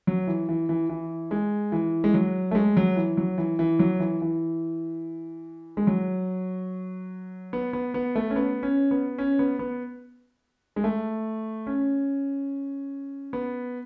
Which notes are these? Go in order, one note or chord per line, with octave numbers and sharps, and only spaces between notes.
F#3
E3
E3
E3
E3
G#3
E3
G#3
F#3
A3
G#3
F#3
E3
F#3
E3
E3
F#3
E3
E3
G#3
F#3
B3
B3
B3
A3
C#4
B3
C#4
B3
C#4
B3
B3
G#3
A3
C#4
B3